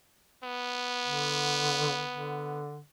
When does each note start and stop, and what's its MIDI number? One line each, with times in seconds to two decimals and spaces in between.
0.43 2.61 59
1.05 2.04 50
2.11 2.80 50